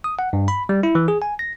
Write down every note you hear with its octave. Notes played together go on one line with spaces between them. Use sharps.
D#6
F#5
G2
B5
G3
E4
E3
G#4
G#5
A#6